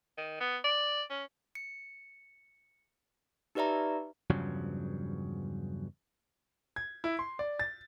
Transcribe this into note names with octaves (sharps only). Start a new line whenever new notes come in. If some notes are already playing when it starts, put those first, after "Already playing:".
D#3
B3
D5
C#4
C#7
D#4 G4 B4 D5 E5 A#5
E2 G2 C#3 F3 F#3
G#6
E4
C6
D5
A6